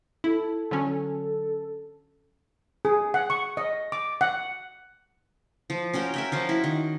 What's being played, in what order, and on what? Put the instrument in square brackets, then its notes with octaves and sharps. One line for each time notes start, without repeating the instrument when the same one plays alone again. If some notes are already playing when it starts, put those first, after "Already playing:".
[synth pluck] E4 [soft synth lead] A4
[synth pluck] D3 F#3 C#4
[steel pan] G#4
F#5
C#6
D#5
D6
F#5
[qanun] F3
C#4 F#4 A#4 G5
A#4 E5 G5
F3 F4 F#4
E4
D#3